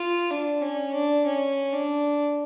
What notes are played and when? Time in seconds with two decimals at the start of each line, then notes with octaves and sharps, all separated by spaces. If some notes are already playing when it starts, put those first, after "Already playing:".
Already playing: F4
0.31 D4
0.62 C#4
0.94 D4
1.26 C#4
1.73 D4